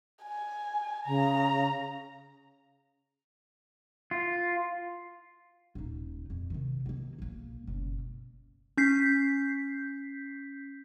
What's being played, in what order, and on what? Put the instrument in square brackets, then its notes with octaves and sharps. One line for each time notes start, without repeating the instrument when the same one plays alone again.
[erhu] G#5
[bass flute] C#3 [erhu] A#5
[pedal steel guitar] F4
[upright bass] D#1 D#4
F2
C3 D#3
D#3 A#3
B1 A#3
F#1 B2
[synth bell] C#4 G6 B6 C7